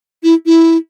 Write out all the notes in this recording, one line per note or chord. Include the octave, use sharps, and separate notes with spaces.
E4
E4